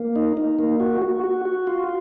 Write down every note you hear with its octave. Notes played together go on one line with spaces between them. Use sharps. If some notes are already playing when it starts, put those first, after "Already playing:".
Already playing: A#3
D#4
D#4
A#3
F#4
F#4
F#4
F#4
F4